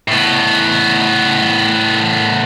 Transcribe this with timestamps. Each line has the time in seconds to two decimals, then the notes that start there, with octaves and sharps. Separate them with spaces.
0.08 A2 B3